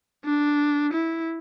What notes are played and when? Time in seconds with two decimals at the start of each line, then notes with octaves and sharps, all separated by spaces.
0.25 D4
0.93 E4